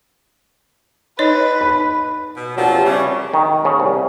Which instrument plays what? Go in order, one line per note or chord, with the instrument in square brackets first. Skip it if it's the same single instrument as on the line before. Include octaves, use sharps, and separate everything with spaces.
[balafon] D#4 C#5 D#5 [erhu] B4
[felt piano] B5
[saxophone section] B2
[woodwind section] E2 A#2 F#3 [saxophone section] F3 C4 D4
[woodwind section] C3
[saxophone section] C#3 G3 [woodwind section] C#5
[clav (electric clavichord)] D#3
C#3
C2